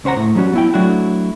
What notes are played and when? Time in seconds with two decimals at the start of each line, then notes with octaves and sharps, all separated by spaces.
0.04 C#2 C#4 C5 F#5 A#5
0.17 A2 A3
0.35 F#3 G3 C#4 F#4
0.53 B3 E4 G5
0.74 F#3 A3 D4 E4 F#4